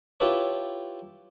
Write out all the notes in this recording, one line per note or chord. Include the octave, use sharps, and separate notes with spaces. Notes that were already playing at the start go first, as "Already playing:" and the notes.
E4 F4 G4 A4 B4 C#5